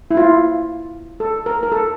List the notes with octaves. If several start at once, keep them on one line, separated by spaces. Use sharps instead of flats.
E4
F4
A4
A#4
A#4
A4